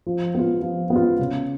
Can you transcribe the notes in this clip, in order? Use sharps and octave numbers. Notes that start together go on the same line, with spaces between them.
F3
B3 F4
F3
B3
F4
C#3